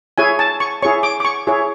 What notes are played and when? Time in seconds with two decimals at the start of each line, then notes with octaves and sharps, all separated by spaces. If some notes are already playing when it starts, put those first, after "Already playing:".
0.18 E4 G#4 C#5 G#5
0.39 A5
0.60 C#6
0.82 E4 G#4 C#5 C#6
1.03 D6
1.20 D6
1.25 C#6
1.47 E4 G#4 C#5